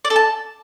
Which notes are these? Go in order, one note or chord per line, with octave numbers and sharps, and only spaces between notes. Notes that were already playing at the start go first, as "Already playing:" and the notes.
D5
A4
A5